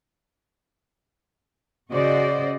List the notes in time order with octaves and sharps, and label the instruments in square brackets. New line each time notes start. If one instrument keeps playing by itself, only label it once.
[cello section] C#3 F#4 C5 D5 D#5